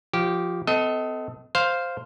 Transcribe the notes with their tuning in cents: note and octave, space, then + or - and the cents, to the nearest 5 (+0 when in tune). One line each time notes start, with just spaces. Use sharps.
F3 +0 G4 -15
C4 -45 A4 +0 D#5 +20
C5 +0 F5 +0